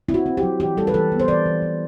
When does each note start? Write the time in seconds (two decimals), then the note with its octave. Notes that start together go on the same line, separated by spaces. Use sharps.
0.08 C4 E4
0.14 F#4
0.26 C4
0.37 G4
0.43 F#3
0.60 E3 G4
0.77 G3 A4
0.87 B4
0.94 E3 A4
1.12 B3
1.20 C5
1.28 E3 D5
1.46 E3
1.62 E3